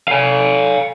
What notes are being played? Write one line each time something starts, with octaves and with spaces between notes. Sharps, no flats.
F5 G#5